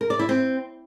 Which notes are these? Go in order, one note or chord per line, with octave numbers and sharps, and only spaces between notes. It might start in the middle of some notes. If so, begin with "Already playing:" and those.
A#4
D5
E4
C4